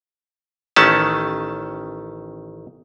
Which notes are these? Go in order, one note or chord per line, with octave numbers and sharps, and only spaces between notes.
A1 D#3 A3 C#4 A5